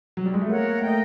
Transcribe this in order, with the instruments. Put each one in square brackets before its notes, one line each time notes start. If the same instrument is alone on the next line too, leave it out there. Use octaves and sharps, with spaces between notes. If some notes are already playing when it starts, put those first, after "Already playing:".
[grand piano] F#3
G3
G#3
A3
[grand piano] A#3 [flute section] A#4 C#5 F#5
[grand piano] A3 [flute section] A#4 D#5 G5